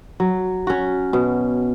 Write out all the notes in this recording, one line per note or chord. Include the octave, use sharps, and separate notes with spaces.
F#3
C#4 F#4
B2